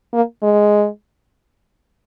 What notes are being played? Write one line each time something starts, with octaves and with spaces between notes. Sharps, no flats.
A#3
G#3